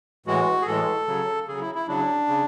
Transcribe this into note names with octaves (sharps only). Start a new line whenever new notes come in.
A2 E3 G#3 F#4
G#4
A2 E3 G#3 A4
C#3 F#3
C#3 F#3 G#4
E4
E4
C#3 F#3 D4
C#3